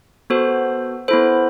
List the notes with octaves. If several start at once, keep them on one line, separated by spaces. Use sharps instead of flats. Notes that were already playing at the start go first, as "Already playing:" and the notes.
B3 F#4 A4 C5
B3 E4 A4 C5